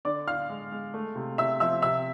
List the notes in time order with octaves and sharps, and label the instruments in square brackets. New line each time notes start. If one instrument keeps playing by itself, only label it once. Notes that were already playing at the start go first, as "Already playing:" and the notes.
[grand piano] D3 D5 D6
D3 F5 F6
G#3
G#3
A3
C3
C3 E5 E6
F3 E5 E6
C3 E5 E6